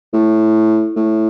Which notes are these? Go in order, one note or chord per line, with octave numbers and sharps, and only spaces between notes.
A2
A2